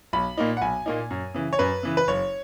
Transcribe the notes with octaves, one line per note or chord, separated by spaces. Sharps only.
B1 B5
A#2 A#3 D#4
F#5
B1 G#5
A#2 A#3 D#4
F#2
C#3 E3
C#5
F#2 B4
C#3 E3
B4
F#1 C#5